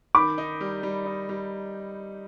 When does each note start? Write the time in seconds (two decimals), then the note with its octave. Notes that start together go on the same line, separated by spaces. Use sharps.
0.15 D#3 B5 D6
0.38 D#4
0.61 G3
0.83 G3
1.06 D#4
1.29 G3